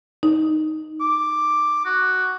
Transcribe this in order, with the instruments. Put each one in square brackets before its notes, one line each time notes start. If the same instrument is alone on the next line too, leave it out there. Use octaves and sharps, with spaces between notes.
[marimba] D#4
[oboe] D6
F#4